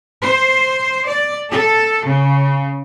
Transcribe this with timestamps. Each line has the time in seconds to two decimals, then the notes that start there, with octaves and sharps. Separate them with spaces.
0.23 C5
1.07 D5
1.50 A4
2.05 C#3